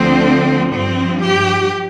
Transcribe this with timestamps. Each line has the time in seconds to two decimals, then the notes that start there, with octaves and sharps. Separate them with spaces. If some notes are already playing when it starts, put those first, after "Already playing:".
Already playing: D2 D3 F3 C4
0.72 G2 F3 C4
1.23 G4